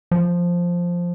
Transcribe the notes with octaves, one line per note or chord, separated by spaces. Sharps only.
F3